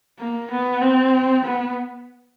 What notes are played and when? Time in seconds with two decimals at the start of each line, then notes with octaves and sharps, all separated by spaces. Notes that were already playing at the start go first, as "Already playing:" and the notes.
0.19 A#3
0.51 B3
0.81 C4
1.44 B3